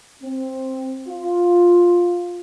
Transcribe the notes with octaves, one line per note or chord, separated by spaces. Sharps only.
C4
F4